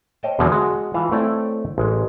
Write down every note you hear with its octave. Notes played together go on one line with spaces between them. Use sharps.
C5 C#5 D#5 G5 A5
E2 B2 D3 F3 F#3
G#3 F#4
E3 F4 F5 A5
A3 C4 E4 C#5 D5 G5
A1 G#3